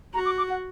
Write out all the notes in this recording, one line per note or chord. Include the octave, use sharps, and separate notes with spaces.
F#4 A#5
D6
D6
F#5